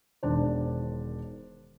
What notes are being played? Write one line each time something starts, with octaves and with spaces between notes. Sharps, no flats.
E1 D#3 D4 C5